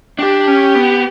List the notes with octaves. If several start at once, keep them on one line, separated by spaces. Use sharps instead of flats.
D4 G4
C#4
B3